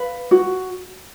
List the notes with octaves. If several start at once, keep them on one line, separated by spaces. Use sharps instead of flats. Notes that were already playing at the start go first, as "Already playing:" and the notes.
Already playing: B4 F5
F#4